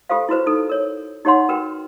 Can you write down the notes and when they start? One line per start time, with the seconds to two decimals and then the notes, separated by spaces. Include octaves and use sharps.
0.09 F4 G4 A4 C5 F5
0.29 E4 F#4 B4 C5
0.46 D#4 A4
0.69 A#4 C#5
1.25 D#4 G4 C#5 F#5 C6
1.48 F#4 A#4 B4 G5